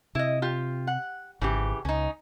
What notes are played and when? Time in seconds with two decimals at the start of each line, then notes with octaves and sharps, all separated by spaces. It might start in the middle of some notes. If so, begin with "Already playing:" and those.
0.15 C3 E4 D#5
0.42 F4 G4
0.87 F#5
1.41 G#1 C#3 E3 G4
1.85 C#2 C#4 D#4